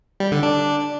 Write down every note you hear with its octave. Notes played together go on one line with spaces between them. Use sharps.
G3
D3
D4